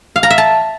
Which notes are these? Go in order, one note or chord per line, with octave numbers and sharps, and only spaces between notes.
F5
A#5
E5
A5